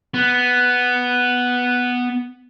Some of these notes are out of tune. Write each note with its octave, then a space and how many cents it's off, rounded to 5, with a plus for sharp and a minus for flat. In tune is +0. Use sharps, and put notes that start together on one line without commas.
B3 +0